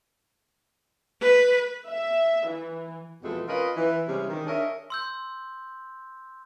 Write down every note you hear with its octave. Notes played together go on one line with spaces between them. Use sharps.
B4
E5
E3
F2 B2 E3 G#3 A3 A4
C#4 F4 A#4 B4 D#5
E3
C3 E3 G3 G#3 C#4
D#3
D4 G#4 A#4 C#5 D#5 E5
C6 E6 G6